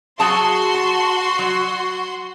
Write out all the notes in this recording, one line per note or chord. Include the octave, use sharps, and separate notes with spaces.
F#3 F#4 G#4 A5 C6
A5
F#3